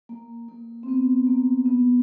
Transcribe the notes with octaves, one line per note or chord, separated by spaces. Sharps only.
A#3
A#3
C4
B3
A#3
B3